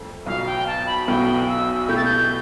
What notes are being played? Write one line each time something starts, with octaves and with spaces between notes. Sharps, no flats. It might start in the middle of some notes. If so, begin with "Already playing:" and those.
Already playing: G1 F2 D3 A3
B1 B2 B3 F4 F5
G5
A5
B5
B1 B2 B3 E4 A4 G5
E6
B2 A3 E4 G4 G6
A6
G6